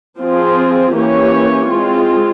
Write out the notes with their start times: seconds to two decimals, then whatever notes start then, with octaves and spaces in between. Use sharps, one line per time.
0.19 F3 C4 F4 G#4
0.94 E3 A#3 C#4 G4 C#5
1.68 G#3 C4 F4